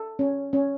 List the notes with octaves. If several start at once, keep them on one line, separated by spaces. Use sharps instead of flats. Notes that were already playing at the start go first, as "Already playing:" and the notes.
Already playing: A4
C#4
C#4